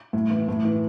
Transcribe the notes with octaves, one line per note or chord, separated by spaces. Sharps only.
A2
E3
A2
E3